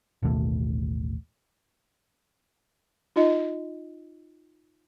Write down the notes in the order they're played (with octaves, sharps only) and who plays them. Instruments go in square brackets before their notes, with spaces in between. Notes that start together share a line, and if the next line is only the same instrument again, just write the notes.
[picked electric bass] A1 D#2 B2 A3
[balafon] D#4 F4 D#5